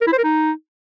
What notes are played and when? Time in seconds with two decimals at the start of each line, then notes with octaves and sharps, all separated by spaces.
0.01 A#4
0.07 E4
0.13 C5
0.18 A#4
0.24 D#4